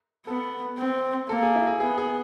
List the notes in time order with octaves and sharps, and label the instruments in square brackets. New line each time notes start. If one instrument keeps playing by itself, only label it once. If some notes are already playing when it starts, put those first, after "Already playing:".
[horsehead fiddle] B3 [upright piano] A4
[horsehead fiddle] C4
[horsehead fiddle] A#3 [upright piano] A4
[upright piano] G#4
E4
G#4
[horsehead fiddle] B3 [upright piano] G#4
[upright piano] G#4